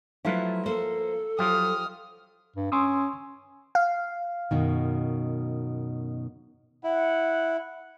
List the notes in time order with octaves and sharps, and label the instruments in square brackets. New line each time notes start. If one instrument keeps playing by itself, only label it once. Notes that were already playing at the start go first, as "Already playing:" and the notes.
[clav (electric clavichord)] F3 F4 B4 [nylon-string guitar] F#3 A3 E4
[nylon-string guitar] A#3 C5 [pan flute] A4
[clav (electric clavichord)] F3 F4 G4 [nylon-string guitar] F#3 [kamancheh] D#6 F6
[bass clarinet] G2
[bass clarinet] C#4 [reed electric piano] C6 D#6 E6
[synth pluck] F5
[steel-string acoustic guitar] F#2 B2 D#3
[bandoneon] E4 [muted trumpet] F#5